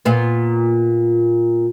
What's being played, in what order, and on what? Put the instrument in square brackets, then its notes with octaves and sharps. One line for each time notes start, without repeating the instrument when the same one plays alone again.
[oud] A#2 B3